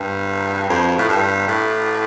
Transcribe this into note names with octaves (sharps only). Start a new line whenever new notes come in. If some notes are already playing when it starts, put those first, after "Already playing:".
Already playing: G2
F2
A2
G2
A2